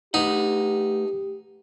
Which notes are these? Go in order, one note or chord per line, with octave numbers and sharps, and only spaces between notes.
A3 D#4 G4 B4 F#5